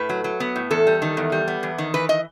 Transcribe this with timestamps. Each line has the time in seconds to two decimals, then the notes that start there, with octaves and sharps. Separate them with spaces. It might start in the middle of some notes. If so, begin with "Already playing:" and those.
Already playing: A2 B4
0.09 F#3
0.24 F#3
0.40 B3
0.56 A2
0.71 E2 A4
0.87 G3
1.02 D#3
1.17 E2
1.32 G3
1.48 B3
1.63 E2
1.78 D#3
1.94 E3 B4
2.09 D#5